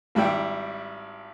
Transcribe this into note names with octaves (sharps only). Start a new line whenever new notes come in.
G#1 G3 E4 G5